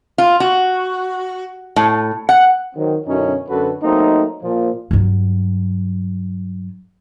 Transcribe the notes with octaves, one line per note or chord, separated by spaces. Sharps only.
F4
F#4
A2
F#5
D#3 F#3 C4
F#2 B2 D3 C#4 D#4 E4
F#2 D3 F#4 A4 B4
F#3 A3 A#3 C4 D#4
A#2 F3
G2 F#3